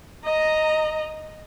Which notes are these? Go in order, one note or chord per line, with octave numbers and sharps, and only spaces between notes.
D#5 A#5